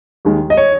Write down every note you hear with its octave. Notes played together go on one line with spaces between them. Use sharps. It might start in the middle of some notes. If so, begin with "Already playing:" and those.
D#2 D#3 G#3
D#5
C#5